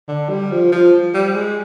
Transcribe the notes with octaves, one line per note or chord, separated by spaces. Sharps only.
D3
G3
F3
F3
G3
G#3